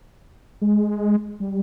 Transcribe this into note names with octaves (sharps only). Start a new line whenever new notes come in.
G#3
G3